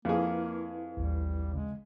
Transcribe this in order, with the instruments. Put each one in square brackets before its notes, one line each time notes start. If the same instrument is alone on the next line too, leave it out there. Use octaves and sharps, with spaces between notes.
[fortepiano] F2 G#4 [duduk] A#3 [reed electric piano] E4 B4
[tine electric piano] A1 D#2 [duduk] G3
[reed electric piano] C#3 [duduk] G#3